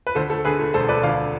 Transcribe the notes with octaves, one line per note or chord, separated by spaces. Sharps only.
B4
D2 A4 C5
A3 A4
D3 G#4 B4
A3
E1 A4 C5
A3 B4 D5
D2 D5 F5